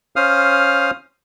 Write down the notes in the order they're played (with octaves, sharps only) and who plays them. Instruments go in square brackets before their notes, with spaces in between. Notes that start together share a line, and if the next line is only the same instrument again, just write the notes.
[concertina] C#4 C5 F5 D#6 F6